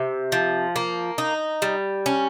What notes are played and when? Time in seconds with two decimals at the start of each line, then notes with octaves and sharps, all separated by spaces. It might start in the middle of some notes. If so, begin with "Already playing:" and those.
Already playing: C3
0.32 F3
0.76 A#3
1.18 D#4
1.62 G3
2.06 C#4